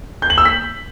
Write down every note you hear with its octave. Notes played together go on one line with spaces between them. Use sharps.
G6
F#7
E6
B6